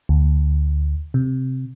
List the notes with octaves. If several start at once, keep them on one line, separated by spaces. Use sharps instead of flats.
D2
C3